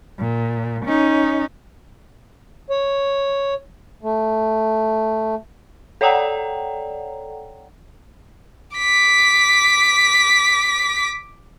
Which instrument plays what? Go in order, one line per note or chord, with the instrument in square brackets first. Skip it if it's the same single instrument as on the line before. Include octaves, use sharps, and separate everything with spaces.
[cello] A#2
C#4 D#4
[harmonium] C#5
A3
[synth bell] A4 C#5 D5 F#5 G5 A#5
[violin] D6 B6